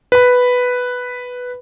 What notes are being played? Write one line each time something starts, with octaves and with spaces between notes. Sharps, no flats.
B4 B5